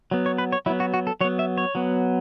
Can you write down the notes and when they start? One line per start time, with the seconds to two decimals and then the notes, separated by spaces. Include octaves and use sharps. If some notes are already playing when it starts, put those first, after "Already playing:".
0.11 F#3 B3
0.26 C#5
0.38 B4
0.52 C#5
0.66 F#3 E4
0.70 B3
0.80 F#4
0.94 F#4
1.07 A4
1.21 F#3 C#5
1.24 B3
1.39 E5
1.58 C#5
1.75 F#3 B3